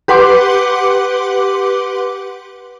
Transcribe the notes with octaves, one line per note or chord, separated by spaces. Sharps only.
G4 B4 F#5 C6 D6